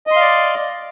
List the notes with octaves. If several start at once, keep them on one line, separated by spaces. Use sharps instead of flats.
D5 D#5 F5 C6